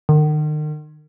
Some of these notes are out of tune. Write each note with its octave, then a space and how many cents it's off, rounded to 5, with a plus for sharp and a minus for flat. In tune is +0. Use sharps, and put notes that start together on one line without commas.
D#3 -40